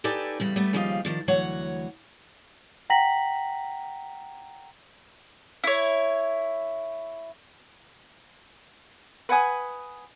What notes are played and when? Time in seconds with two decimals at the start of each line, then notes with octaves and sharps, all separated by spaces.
0.04 D#4 G4 A4 B4 D5 G#5
0.40 E2 C#3 G3
0.56 G3 A3 B3
0.73 D#2 C#3 F3 G3 D#5 F5
1.05 D#3 F3 D4
1.28 D2 E3 F#3 C#5 F#5
2.90 F#5 G5 A#5 A#6 B6 F#7
5.64 E4 C#5
9.29 B4 F#5 G#5 D#6